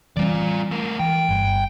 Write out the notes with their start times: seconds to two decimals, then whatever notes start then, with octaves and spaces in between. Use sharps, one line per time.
0.17 E3 G3 C4 F4 D5
0.71 A3 A#4
0.99 E3 G5
1.28 G1 G2